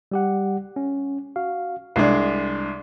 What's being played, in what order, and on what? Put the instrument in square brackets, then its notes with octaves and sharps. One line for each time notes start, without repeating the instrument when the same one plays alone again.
[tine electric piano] G3 G4 F#5
C#4
F#4 F5
[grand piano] C2 G#3 D4 [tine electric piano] C7